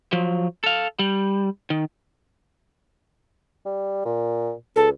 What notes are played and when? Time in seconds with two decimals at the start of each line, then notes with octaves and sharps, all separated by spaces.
0.13 F3 F#3
0.64 A4 F5
0.99 G3
1.70 D#3
3.65 G3
4.05 A#2
4.76 C#2 A4